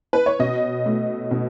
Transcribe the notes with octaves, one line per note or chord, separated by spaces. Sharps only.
B4
C#5
B2 D#5
A3
B2